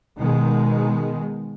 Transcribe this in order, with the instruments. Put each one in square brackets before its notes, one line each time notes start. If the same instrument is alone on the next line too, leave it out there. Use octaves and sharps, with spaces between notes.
[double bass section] B2 D#3 G#3